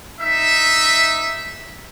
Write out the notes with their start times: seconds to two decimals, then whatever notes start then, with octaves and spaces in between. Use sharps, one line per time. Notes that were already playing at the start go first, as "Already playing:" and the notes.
0.20 D#4 E5